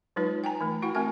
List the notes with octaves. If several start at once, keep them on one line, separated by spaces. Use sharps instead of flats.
F#3 G#3 D#4 F4 B4
G5 G#5 A#5
E3 A3
E4 F#4 F#5 G5
A3 C4 F#4 A#4 G#5 A5